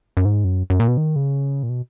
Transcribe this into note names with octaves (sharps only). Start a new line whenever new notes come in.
F#2
G#2
F#2
F#2
A#2
B2
D#3
C#3
A#2
B2